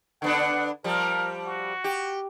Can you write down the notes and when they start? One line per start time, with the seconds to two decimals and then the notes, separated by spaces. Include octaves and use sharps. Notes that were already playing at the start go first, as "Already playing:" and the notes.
0.22 D3 B3 D4 F#5
0.84 F3 G3 A#4
1.46 F#4
1.84 G4